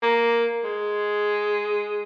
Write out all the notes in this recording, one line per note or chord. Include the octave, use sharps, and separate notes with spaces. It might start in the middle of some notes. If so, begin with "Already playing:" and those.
A#3
G#3